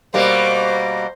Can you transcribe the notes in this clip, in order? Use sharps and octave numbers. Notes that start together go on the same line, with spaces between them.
B2 G3 A#3 C5